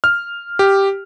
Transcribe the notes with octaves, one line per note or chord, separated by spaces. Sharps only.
F6
G4